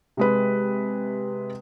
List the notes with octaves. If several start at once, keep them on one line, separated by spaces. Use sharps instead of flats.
C3 G#3 B4